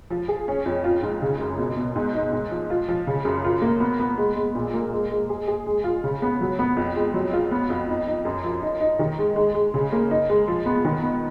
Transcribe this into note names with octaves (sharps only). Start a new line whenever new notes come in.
F3
G#4
C#4
F2
F4
G#2
C#3
F#2
B2
B2
G#2
D#4
G#2
F3
F4
F3
C#3
F#2
F4
A#3
B3
B3
G#3
G#3
A#2
A#3
G#3
G#3
G#4
G#4
G#3
F4
C#3
B3
F#3
B3
F2
G#3
F#3
F4
B3
F2
D#4
D#4
F#2
F3
D#4
D#4
D#3
G#3
G#3
G#3
C#3
A#3
D#4
G#3
F3
B3
D#3
B3